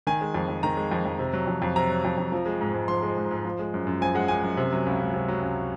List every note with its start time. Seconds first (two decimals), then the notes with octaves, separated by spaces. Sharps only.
0.07 D#3 G#5
0.21 G#3
0.34 F2
0.48 F2
0.63 D#3 A#5
0.77 G#3
0.92 F2
1.06 F2
1.19 C3
1.33 F#3
1.47 F2
1.62 F2
1.76 C3 A#5
1.90 F#3
2.05 F2
2.18 F2
2.32 F3
2.46 G#3
2.61 G#2
2.74 G#2
2.88 F3 C6
3.03 G#3
3.17 G#2
3.31 G#2
3.45 F3
3.59 G#3
3.74 F#2
3.87 F#2
4.01 F3 G#5
4.15 G#3 F#5
4.28 F#2 G#5
4.43 F#2
4.57 C3
4.72 F#3
4.86 C#2
5.00 C#2
5.14 C3
5.28 F#3
5.42 C#2